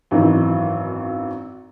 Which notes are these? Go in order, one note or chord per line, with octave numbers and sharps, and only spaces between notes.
G#1 F#2 D#3 E3